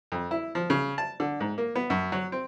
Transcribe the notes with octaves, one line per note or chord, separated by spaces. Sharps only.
F2
E4
F3
C#3
A5
D3
G#2
A#3
B3
F#2
F#3
C4